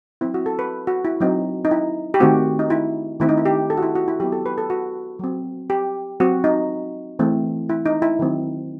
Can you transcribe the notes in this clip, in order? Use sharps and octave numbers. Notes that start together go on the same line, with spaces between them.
F#3 C4 E4
F#4
A4
B4
F#4
E4
F#3 C4 D#4
D#4
E4
G4
D#3 A3 C4 F#4
D#4
E4
D#3 A3 C4 E4
D#4
E4
G4
A4
F#4
E4
F#4
E4
F#3 B3 G4
A4
B4
A4
F#4
F#3 C4
G4
F#3 C4 F#4
D#4
E3 A3 C4
E4
D#4
E4
D#3 F#3 C4